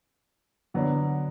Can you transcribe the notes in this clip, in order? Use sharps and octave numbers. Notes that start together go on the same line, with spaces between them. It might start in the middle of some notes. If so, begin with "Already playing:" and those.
D3 F#3 B3 D4